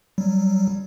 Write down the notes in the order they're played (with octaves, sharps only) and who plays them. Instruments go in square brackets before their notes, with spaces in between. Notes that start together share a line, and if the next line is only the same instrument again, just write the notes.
[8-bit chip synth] F#3 G3